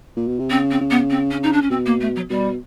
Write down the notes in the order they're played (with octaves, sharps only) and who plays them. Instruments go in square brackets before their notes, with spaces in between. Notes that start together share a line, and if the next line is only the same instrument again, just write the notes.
[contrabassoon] A#2
B2
C3
[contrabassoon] C#3 [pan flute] C4
[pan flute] C4
[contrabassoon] C#3
[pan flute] B3
C4
C#4
D#4
D4
C#4
[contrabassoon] B2 [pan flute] C4
[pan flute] A#3
A3
F#3
[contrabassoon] B2 [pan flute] G3